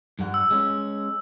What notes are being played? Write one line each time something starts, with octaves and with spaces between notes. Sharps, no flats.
G2 G3 F#5
E6
G#3 C#4